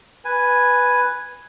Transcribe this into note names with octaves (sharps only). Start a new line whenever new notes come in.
B4 G#5